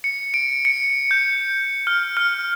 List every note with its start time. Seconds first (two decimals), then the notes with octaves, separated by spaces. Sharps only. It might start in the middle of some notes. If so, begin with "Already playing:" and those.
0.04 C#7
0.34 D7
0.65 C#7
1.11 G6
1.87 F6
2.17 F6